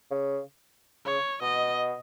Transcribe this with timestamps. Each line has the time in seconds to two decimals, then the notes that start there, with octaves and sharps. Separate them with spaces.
0.11 C#3
1.06 C#3 C#5
1.41 B2 D#5